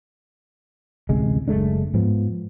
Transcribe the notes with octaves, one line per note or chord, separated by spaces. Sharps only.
A1 D2 C3 G#3
F#1 G#3 A3 D4
G#2 F3 B3